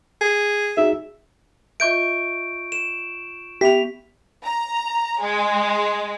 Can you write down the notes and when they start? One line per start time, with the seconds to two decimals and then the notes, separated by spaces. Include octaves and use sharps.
0.21 G#4
0.77 D#4 F#4 G#4 E5
1.80 F4 D#5 E5 C#6 G6 D7
2.72 E7
3.61 B3 G4 E5 B6 F7
4.44 A#5
5.21 G#3